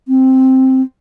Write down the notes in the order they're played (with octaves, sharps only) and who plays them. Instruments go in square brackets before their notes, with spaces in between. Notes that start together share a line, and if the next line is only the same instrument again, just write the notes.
[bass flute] C4